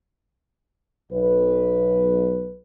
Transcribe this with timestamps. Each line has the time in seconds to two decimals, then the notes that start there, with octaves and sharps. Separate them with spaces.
1.11 B1 B4